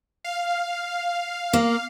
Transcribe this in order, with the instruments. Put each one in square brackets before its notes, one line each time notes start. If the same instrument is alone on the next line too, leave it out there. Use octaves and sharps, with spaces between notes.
[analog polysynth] F5
[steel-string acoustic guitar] A#3